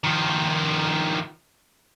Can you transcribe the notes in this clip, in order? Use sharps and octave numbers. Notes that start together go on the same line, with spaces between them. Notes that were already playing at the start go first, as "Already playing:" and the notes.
D#3 F3